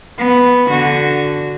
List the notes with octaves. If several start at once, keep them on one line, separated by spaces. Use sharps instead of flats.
B3
D3 F#4